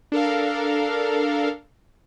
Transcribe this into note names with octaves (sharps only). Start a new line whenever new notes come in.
D4 A4 A#4 F5